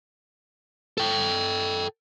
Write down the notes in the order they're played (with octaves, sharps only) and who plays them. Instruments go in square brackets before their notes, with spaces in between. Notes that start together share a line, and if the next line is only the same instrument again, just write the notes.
[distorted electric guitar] A4 G5